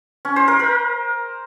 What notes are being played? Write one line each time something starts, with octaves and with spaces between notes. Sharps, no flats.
C#4
C5
A#4
A#4